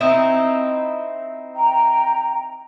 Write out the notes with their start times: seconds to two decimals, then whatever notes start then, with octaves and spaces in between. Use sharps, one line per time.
0.01 C4 D#4 E4
1.55 G5 A#5